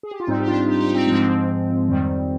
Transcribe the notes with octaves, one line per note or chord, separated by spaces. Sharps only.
G#4
G4
F4
G#2 G3 C4 D#4
G4
D4 F4
D#4 G4
D#4 G4
C4 D#4
G#2 F3 G#3 C4
F2 D#3 G3